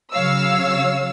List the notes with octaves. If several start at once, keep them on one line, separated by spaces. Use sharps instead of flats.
C#3 F#3 C#5 F5 E6